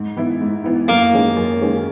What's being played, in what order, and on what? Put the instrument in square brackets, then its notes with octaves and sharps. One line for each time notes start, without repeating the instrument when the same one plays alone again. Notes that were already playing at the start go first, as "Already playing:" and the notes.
Already playing: [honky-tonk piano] G#2
E3 B3 E4
G#2
E3 B3 E4
[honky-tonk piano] F#2 [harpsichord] A#3
[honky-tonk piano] D#3 G#3 C#4 G#4
F#2
D#3 G#3 C#4 G#4